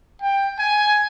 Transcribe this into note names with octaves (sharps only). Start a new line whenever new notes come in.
G5
G#5